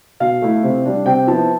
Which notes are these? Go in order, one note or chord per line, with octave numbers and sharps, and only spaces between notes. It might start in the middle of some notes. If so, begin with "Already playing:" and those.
B2 F5
A3 E4
C3
G3 D4
C3 G5
F3 B3 E4 A5